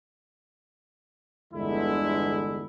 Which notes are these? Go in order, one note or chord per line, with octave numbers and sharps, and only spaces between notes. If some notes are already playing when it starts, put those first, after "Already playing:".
G1 E2 D3 G#3 E4